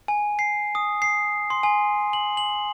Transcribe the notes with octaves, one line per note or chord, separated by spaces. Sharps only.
G#5
C7
D#6
C7
C6
G#5
F#7
F#7